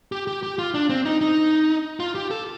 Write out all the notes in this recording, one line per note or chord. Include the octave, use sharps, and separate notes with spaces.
G4
G4
G4
F4
D4
C4
D#4
D#4
F4
G4
A4